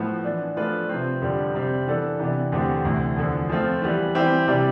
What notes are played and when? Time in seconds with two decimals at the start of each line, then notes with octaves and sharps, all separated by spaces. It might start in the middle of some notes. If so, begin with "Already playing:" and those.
Already playing: A2 F3 B3
0.24 E3 B3 D4
0.56 F3 A3 D4 F4 B4
0.89 C3 F3 C4
1.22 F2 D3 G3 D4
1.54 C3 G3 C4
1.87 E3 B3 D4 A4
2.19 C3 E3 B3 D4
2.52 E2 D3 A3 C4 G4
2.85 D2 C3 E3
3.16 E2 D3 F3
3.49 F3 A3 C4 F4
3.82 E3 G3 B3
4.15 E3 G3 C4 E4 G4
4.47 C3 E3 G3 D4 G4